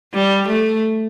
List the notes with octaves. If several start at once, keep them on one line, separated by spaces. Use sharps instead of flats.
G3
A3